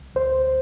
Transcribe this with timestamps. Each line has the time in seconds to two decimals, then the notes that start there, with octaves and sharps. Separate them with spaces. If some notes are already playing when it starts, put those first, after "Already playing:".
Already playing: C2
0.15 D2 C5